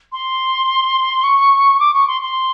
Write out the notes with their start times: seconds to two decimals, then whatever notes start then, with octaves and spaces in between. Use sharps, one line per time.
0.12 C6
1.24 C#6
1.80 D6
1.94 C#6
2.08 C6
2.22 C6